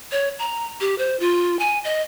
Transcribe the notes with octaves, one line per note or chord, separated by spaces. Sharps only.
C#5
A#5
G4
C5
F4
G#5
D#5